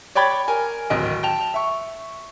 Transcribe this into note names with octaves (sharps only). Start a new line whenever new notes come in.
C#5 D5 G5 B5 G#6 A6
A#4 G#5
D1 G#1 D#5 D7
G5 A5 F7
E5 C#6